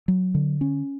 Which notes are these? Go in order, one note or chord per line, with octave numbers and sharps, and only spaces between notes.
F#3
D3
C#4